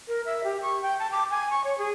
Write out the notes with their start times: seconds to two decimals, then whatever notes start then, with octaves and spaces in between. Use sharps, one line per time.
0.08 A#4
0.26 E5
0.44 G4
0.62 C#6
0.82 G5
0.99 A5
1.12 D6
1.31 G#5
1.51 C#6
1.64 C#5
1.78 G#4